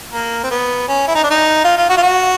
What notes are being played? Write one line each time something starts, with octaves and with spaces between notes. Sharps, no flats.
A#3
C4
B3
C#4
E4
D#4
D4
D#4
F4
F4
F#4
F4
F#4